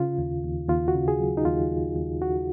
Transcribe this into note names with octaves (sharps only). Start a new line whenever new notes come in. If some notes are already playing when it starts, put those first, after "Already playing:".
Already playing: C#3 F4
D#2
D#2
D#2 F4
F#4
C#3
G#4
F#3
D#4
D#2 F4
D#2
D#2
D#2 F#4